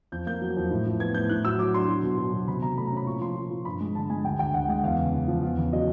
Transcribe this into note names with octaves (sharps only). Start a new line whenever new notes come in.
F2 G6
A#3 G6
F#3
F2
A2
F3
B3 G#6
A2 G6
A2 F#6
F#3 E6
F#3 D6
D4 C6
F#3
B2
F#3
B2
C3 B5
C3 A#5
A3 B5
A#5
C#4 B5
A#2 C#6
F3 C6
F3
F3
G2 B5
G#3
D3 A5
G#3 G#5
D2 G5
D2 G5
D2 F#5
G#3 F#5
E2 F5
C#3
C#3
F3
E2
C#3
F#3 D#5